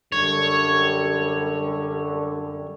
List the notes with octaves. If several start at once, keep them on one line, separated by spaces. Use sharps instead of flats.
F#2 D3 G3 C#5